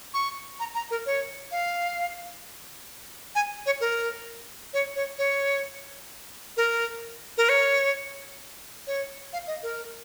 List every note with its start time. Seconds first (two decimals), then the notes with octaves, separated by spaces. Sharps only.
0.14 C#6
0.60 A#5
0.75 A#5
0.91 A#4
1.06 C#5
1.51 F5
3.35 G#5
3.66 C#5
3.81 A#4
4.73 C#5
4.96 C#5
5.18 C#5
6.57 A#4
7.38 A#4
7.49 C#5
8.87 C#5
9.33 F5
9.47 D#5
9.63 A#4